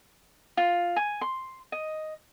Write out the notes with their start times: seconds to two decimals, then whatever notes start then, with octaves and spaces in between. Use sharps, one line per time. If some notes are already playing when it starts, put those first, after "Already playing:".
0.57 F4
0.96 G#5
1.21 C6
1.72 D#5